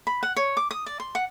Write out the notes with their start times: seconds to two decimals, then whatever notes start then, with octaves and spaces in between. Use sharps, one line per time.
0.07 B5
0.23 F#5
0.36 C#5
0.57 D6
0.71 D#6
0.86 D5
1.00 C6
1.15 F#5